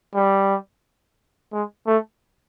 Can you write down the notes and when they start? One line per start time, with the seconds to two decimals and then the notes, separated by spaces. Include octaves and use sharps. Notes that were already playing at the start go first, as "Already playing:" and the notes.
0.15 G3
1.52 G#3
1.86 A3